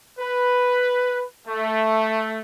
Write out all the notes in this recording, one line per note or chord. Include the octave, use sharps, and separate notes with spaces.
B4
A3